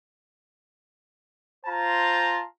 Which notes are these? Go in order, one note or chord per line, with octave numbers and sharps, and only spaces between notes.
F4 C5 A5 A#5